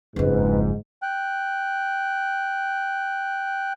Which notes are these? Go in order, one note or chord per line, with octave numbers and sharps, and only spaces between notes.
F#1 F2 G#2 B4
G5 F#6